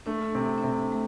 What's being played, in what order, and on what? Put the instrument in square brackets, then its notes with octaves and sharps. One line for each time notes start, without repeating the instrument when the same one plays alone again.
[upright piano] A3 [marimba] D4
[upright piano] C3 [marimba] C4
[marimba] D4
[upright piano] C3 [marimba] C4
[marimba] A3